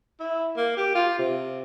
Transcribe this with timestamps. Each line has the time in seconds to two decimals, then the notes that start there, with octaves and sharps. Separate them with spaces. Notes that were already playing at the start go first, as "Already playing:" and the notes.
0.20 E4
0.57 A#3
0.77 G4
0.95 F4
1.18 C3